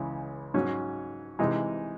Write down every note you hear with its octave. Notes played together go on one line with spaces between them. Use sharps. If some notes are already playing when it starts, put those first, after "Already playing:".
Already playing: C#2 C#3 E3 G#3
G#2 F#3 C#4
C3 E3 G#3 D#4